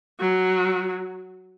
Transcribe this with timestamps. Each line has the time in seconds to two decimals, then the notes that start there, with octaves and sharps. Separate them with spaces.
0.20 F#3